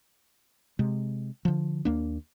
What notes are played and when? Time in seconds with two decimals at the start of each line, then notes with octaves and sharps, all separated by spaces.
0.79 C3 G#3
1.45 D3 F3
1.85 D#2 A#3 D4